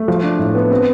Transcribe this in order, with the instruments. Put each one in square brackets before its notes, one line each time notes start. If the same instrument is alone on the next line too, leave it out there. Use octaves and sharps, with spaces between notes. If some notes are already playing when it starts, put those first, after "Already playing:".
Already playing: [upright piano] A3
F3
D4
A2
B3
C4